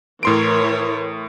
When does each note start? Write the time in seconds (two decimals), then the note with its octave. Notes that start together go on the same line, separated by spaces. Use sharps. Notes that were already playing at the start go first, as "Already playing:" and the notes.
0.23 A2 E3 A#4 C#5 C6 D7